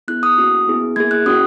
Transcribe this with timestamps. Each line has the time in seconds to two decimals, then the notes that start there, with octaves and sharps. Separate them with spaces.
0.08 B3 E4 G#4 F#6
0.23 D#6
0.38 A#3 C#4 F#4
0.68 B3 E4 G#4
0.96 A#3 E4 G#4 G#6
1.11 F#6
1.26 C#4 F#4 D#6